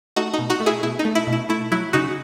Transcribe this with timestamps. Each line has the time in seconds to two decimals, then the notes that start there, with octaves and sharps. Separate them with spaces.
0.16 A3 D#4 F#4
0.34 D#4
0.38 B2
0.50 D#4 F#4
0.60 A3
0.66 E4 G#4
0.82 B2 E4
0.99 D#4
1.05 A3
1.15 E4
1.27 B2
1.33 E4
1.49 A3 E4
1.71 F#3 E4
1.93 C#3 D#4 F#4